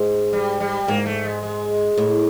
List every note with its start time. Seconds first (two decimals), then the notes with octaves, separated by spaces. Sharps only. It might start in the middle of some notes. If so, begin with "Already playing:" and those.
Already playing: G#2 G#3
0.33 G3
0.60 G3
0.88 G#2 A#3
1.06 A3
1.25 G#3
1.42 G#3
1.97 A2